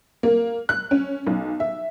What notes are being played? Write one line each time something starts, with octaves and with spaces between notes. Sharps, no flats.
A#3
F#6
C#4
B1
E5